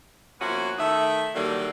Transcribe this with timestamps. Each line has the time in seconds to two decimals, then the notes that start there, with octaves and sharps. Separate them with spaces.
0.40 F3 A#3 B3 C#4 E4 F#4
0.78 D#3 A3 D#4 E5
1.35 D#3 E3 F#3 G3 A#3 A4